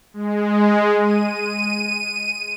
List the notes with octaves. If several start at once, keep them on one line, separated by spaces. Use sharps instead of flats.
G#3
D#7